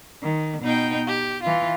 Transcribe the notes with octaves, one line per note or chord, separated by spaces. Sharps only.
D#3
B2 D#4 G5
G4
E3 F4